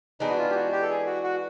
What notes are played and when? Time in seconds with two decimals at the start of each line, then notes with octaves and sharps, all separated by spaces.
0.20 E3 G#3 B3 D4 D#4
0.30 F#4
0.38 F4
0.50 G4
0.55 F#4
0.72 G4
0.82 A4
0.89 G#4
1.06 F#4
1.24 F#4